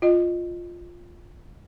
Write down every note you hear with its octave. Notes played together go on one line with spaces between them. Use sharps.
F4 D#5